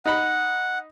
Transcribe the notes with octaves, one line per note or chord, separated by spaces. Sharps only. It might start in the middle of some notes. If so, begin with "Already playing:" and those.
D#4 F#5 B5